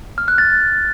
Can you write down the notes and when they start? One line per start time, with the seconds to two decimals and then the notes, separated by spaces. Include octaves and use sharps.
0.18 F6
0.28 F#6
0.38 A6